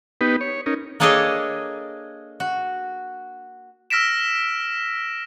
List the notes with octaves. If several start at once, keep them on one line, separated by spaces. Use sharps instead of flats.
B3 D#4 G4 B4
C#5
C#4 D#4 A#4
A#3 D4 G#4 A4 C#5 D#5
F#4
E6 F6 A#6 B6 D7 E7